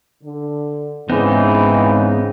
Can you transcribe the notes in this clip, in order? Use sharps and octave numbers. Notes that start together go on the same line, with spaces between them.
D3
G#2 C#3 E3 B3 C4 D#4